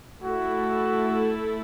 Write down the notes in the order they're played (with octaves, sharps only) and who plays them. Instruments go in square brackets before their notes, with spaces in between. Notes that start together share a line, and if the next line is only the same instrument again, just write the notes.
[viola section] A3 E4 A4 [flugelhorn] F#4